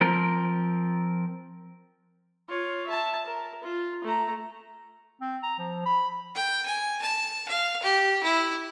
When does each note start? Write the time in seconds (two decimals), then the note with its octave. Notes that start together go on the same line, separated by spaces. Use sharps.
0.01 F3 C4 A#4
2.49 F4 C#5
2.86 E5 A5
3.26 A#4
3.63 F4
4.04 A3 A#5
5.21 C4
5.43 A#5
5.58 F3
5.86 B5
6.35 G5
6.66 G#5
7.02 A5
7.48 F5
7.83 G4
8.23 E4